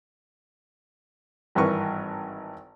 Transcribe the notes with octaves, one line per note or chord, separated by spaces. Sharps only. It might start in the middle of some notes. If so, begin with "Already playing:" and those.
G#1 G2 E3 A#4 B4 C#6